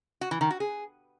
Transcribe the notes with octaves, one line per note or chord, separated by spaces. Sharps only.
F#4
E3
D#3
F#4
G#4